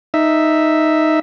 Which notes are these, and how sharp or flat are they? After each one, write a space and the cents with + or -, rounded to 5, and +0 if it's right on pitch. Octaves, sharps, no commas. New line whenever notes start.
D#4 +0 E5 +0